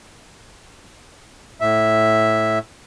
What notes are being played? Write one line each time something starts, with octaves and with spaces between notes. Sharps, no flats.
A2 E5